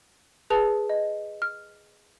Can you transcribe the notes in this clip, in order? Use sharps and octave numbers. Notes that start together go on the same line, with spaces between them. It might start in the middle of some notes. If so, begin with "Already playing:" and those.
G#4 B4 A5 F7
D#5
F6